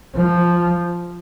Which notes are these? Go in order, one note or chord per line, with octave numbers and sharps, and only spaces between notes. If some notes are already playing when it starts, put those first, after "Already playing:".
F3